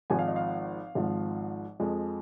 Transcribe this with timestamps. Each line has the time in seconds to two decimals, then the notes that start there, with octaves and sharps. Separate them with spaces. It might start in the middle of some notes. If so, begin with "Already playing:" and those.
0.10 G#1 G#2 F3 G#5
0.19 F5
0.28 D#5
0.36 F5
0.95 G#1 G#2 F3
1.80 F2 F3 G#3